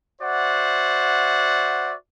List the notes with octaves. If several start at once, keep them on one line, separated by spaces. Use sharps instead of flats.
F#4 C5 D5 E5 F#5